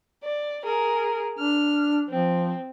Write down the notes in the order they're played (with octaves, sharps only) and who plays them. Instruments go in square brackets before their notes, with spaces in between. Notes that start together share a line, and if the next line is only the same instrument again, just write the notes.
[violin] D5
G#4 A#4
[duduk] D4 [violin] F6
[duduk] F3 [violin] C4